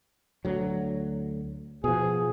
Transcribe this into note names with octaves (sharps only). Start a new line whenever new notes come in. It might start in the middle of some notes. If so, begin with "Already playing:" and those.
D2 F#3
B2 F3 G#4